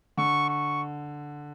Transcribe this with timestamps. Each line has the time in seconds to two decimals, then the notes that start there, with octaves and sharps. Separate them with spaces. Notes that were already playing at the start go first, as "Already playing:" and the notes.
0.17 D3 C#6
0.49 C#6